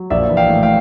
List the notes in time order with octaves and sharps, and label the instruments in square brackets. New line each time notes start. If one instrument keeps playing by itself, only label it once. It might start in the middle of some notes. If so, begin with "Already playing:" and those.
Already playing: [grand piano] F#3
A#1 D5 E5
E3
F5 G5
A2
F5 G5